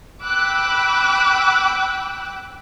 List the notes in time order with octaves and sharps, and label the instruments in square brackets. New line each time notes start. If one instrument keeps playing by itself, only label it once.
[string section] G5 B5 D6 E6 F#6